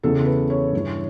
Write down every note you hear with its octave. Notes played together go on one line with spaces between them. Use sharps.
E2 C#3 E3 A4
B4
C#5
G2 E3